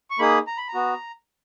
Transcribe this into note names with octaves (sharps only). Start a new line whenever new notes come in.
C#6
A#3 D#4 G#4 B5
A#5
B5
A#5
B3 F#4